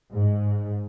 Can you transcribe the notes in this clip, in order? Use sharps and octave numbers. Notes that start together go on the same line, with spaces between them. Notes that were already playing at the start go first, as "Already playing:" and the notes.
G#2